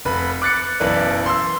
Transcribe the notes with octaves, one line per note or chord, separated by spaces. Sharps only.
F1 B4 B5
D6 F#6 A6 C#7
F#1 B1 E3 B4 D5
C6 E6